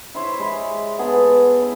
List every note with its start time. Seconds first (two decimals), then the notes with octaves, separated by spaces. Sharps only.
0.15 E4 C5 C#5 E5
0.40 G#3 B5
0.99 B3 G#4 A4 A#5
1.61 E4